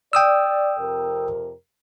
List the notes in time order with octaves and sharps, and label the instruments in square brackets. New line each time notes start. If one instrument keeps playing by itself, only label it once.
[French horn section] D5 [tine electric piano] G5 D#6 E6
[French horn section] F2 C3 A#4